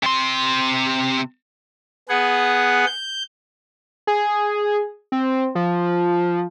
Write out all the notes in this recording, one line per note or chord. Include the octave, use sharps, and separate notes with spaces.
C3 C6
B3 G#4 F#5
G6
G#4
C4
F3